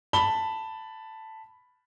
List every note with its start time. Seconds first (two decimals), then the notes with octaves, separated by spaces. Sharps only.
0.13 A5 B5 G7